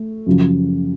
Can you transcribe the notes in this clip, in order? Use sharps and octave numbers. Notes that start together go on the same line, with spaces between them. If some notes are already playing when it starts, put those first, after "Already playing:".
Already playing: A3
F#2 C#3 F3